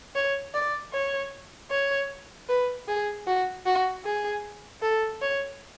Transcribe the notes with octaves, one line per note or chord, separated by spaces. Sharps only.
C#5
D5
C#5
C#5
B4
G#4
F#4
F#4
G#4
A4
C#5